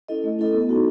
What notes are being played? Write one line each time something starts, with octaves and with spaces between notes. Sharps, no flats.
C#4 E4 A4 D#5
A3
C#4 E4 A4 D#5
B3
D#4 F#4